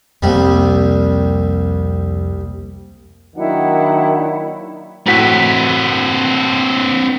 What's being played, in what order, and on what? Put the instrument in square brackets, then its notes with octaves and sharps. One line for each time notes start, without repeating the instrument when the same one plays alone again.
[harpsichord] C2 G3 [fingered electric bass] F2 A#3
[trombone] D#3 [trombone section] F#3 A#3 D4 [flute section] E4 F#5
[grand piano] A2 F#4 B6 [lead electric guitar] C4 B4